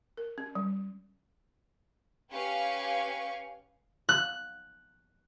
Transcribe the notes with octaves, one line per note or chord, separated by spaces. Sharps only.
A#4
C#4
G3
C#4 G4 B4 F5 C#6
F#6